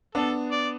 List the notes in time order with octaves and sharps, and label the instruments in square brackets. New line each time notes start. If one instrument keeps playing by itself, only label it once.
[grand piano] B3 D4 [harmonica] A4
[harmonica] D5